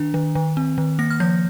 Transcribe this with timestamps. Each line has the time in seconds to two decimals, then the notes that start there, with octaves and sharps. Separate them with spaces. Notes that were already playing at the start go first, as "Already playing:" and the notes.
Already playing: D#3 D4
0.14 D#3
0.35 D#3
0.57 C4
0.78 D#3
0.99 A#3 A#6
1.10 F6
1.20 F3 G6